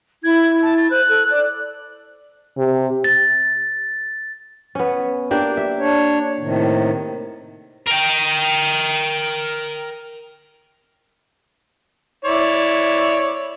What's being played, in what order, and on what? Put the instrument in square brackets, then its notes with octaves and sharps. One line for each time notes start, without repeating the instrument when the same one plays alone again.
[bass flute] E4 [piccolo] G#6
[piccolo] A5
A6
[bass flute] C5 [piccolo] F#6
[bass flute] A4
D5
[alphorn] C3
[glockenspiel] A6
[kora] B3 C#4
A#3 D4 G4
E5
[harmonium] D4 C#5
A2 C3 D#3
[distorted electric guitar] A#4 G5
[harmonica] E4 C#5 D5